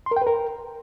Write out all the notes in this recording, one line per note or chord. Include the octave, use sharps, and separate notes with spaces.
C6
A#4
G5
B4
A#4